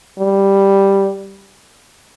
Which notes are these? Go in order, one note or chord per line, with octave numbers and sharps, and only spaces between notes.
G3